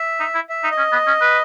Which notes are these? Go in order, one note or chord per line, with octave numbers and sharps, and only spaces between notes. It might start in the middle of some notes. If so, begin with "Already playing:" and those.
Already playing: E5
D#4
E4
E5
D#4
D#5
C#4
B3
C#4
B4